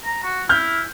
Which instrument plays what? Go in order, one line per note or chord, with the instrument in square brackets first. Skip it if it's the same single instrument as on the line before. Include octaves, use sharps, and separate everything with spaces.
[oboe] A#5
F#4
[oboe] E4 [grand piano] F6 G6